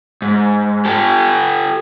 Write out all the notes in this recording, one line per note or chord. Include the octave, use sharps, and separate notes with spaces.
G#2
G4 A4